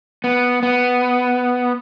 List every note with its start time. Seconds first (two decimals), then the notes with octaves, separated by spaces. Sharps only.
0.24 B3
0.63 B3